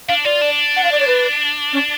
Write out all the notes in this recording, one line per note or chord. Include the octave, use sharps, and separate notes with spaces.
D4 F5
F4 D5
D4
F#5
F5
D5
C#5
B4
C#4